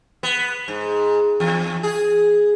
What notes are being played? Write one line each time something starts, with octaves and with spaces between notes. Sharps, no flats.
B3
G#2
E2
G#4